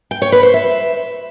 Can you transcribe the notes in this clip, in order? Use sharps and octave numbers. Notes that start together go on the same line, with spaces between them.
G5
C#5
B4
C5
E5